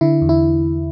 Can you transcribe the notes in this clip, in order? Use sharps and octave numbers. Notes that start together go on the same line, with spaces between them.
D3 E4
E2
E4